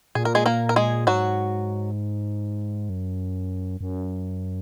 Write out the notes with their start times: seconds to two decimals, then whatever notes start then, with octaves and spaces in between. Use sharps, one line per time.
0.15 A#2 G#4
0.25 A#4
0.35 G#3 G#4
0.46 A#3 A#4
0.69 A#4
0.76 G#3 G#4
1.07 G#2 F#3 F#4
2.89 F#2
3.81 F#2